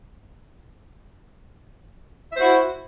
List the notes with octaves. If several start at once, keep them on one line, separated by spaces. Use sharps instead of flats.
E4 F#4 C5 E5